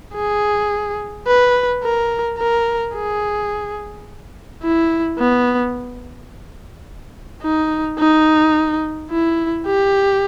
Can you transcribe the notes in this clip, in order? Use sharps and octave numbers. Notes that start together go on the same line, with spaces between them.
G#4
B4
A#4
A#4
G#4
E4
B3
D#4
D#4
E4
G4